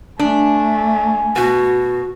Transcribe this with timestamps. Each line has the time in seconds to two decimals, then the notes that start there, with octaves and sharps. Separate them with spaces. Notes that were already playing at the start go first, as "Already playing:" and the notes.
0.19 A3 D4 G#5
1.36 B2 B3 F#4